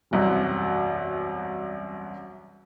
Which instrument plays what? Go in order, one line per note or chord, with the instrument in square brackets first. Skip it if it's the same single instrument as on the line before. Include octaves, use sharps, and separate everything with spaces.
[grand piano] E1 C2 F#2